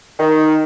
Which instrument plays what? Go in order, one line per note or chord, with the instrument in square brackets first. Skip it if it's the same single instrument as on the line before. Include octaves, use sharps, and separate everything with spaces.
[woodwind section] D#3